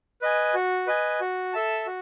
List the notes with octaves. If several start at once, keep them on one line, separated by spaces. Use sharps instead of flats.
B4 D#5 G#5
F#4
B4 D#5 G#5
F#4
A4 E5 A5
F#4